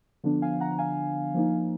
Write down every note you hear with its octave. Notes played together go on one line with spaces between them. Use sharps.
D3 F3 B3 D4
F5 G#5
F#5 A#5
F5 G#5
F3 A#3 D#4